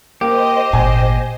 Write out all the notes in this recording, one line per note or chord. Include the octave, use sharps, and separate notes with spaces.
A#3 G4 C5 D#5
G#1 A#2 G#5